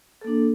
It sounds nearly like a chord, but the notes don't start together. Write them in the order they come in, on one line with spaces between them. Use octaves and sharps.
A4 A#3 D4